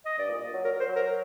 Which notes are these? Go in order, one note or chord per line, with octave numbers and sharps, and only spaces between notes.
D#5
G2 D5
A#2
F#3
F#3 A#4
C5
F#3
A#4